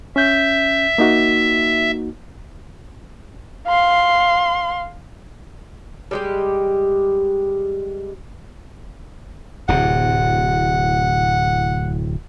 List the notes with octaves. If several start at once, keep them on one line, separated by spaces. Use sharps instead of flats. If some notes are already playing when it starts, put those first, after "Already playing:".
C#4 E5 G6
A#3 D#4 F#4
F5 C6
G3 G#3 G4
D1 A2 C3 F#5